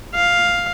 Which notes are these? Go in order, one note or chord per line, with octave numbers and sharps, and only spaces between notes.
F5